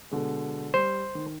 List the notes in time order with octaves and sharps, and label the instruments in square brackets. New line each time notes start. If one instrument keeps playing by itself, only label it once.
[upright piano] B2 D3 G#3
[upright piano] G3 [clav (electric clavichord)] C5
[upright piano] D#3